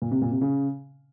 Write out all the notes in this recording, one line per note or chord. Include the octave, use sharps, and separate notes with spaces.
A#2
C3
A#2
C3
C#3